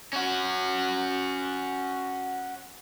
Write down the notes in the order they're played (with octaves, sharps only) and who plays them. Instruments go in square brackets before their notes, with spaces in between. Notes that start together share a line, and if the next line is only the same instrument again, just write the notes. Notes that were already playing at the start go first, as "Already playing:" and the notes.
[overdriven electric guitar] C#4 F#4